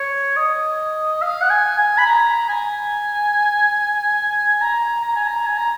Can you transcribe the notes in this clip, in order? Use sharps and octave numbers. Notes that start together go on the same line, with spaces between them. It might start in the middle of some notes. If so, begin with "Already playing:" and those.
Already playing: C#5
D#5
F5
F#5
G#5
G#5
B5
A#5
G#5
A#5
A#5
G#5
A#5
G#5
A#5